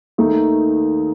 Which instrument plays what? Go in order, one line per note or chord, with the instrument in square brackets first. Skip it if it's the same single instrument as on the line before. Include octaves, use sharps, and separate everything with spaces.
[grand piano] D#2 D#3 A3 D#4